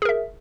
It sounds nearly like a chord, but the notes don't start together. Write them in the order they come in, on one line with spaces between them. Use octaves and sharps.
G#4 A#4 E5